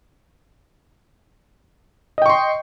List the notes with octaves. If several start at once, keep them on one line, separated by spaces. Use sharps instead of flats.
D#5 G5 C6 C#6